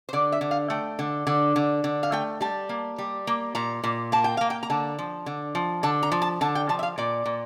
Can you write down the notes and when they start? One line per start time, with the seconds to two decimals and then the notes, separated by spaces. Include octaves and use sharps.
0.09 C5
0.13 D3 D5
0.32 E5
0.41 D3
0.51 F5
0.70 A3 G5
0.99 D3
1.27 D3
1.56 D3
1.84 D3
2.03 F5
2.12 A3 G5
2.41 G3 A5
2.69 A#3
2.98 G3
3.27 A#3
3.55 A#2 A#5
3.84 A#2
4.12 A#3 A5
4.24 G5
4.37 A#3 F5
4.50 G5
4.63 A#5
4.70 D3 A5
4.99 F3
5.26 D3
5.55 F3
5.83 D3 A5
6.03 A#5
6.12 F3
6.22 A5
6.41 D3 A5
6.55 G5
6.69 F3 A5
6.79 E5
6.83 F5
6.98 A#2 D5
7.26 A#2